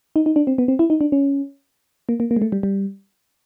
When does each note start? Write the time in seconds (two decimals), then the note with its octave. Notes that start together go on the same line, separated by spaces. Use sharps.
0.16 D#4
0.26 D#4
0.36 D4
0.47 C4
0.58 B3
0.68 C4
0.79 E4
0.90 D#4
1.01 D4
1.12 C#4
2.09 A#3
2.20 A#3
2.31 A#3
2.36 G#3
2.42 A3
2.52 G3
2.63 G3